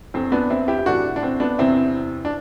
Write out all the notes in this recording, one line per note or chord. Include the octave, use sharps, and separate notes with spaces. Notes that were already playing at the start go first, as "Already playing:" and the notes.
E2 D3 C4
B3 D4
C4 E4
E4 G4
E4
A2 E3 D4 F#4
D4
C4
B3 D4
E2 C3 E3 C4 E4
D4